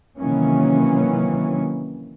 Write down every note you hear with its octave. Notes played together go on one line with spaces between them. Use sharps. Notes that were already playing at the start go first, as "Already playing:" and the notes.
C3 D#3 E3 F#3 A#3 C#4